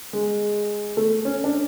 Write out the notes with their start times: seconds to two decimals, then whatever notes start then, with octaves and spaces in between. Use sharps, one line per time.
0.13 G#3
0.97 A3
1.25 C#4
1.44 D4